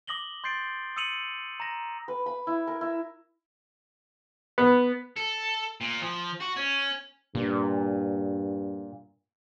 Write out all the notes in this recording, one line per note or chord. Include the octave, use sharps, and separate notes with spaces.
D6 D#6 A#6 F#7 G7
C6 G6 A6 C7 D7
D#6 E6 C#7 D#7 F7 F#7
A#5 A#6
B4
B5
E4
A#4
E4
B3
A4
A#2
F3
F#4
C#4
G2 A#2